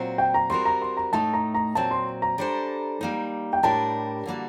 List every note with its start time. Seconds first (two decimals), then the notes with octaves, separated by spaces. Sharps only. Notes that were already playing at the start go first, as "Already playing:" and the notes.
Already playing: A#2 F#3 C4 F#4 C5
0.18 G5
0.34 A#5
0.50 G3 C4 F#4 A#4 C6
0.65 A#5
0.82 C6
0.97 A#5
1.13 A2 A3 D#4 A5
1.34 A#5
1.54 A#5
1.75 A#2 F#3 C4 A5
1.91 C6
2.22 A#5
2.38 G3 D4 A4 C5
3.01 G3 A#3 D#4
3.53 G5
3.63 A2 G3 D4 G4 A#4 A5
4.26 D3 G3 A#3 F#4